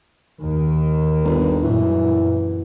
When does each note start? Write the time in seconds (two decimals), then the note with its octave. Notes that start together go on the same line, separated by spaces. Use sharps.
0.41 D#2 D#3
1.24 G1
1.64 F#2 A#2 E3